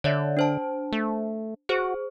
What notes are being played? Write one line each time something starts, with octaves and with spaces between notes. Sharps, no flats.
D3 C#5 D5 E5
D4 C5 A5
A3
F#4 G#4 C5